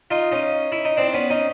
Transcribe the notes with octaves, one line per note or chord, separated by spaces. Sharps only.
D#4 F4
C#4 D#4
E4
D#4
C4 D4
B3 C#4
C#4 D#4